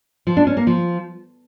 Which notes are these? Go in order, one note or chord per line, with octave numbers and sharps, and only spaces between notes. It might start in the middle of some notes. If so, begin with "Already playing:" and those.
F3
D4
C#4
A#3
F3